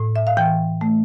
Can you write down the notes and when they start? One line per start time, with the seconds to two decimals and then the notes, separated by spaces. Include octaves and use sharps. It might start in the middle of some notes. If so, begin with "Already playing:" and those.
Already playing: A2
0.16 E5
0.27 F5
0.37 E3 G5
0.81 A3